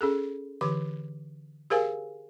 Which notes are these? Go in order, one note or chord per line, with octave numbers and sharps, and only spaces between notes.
C#4 G#4 A4
D3 E3 G4 D6
G4 G#4 A#4 C5 F5 G#5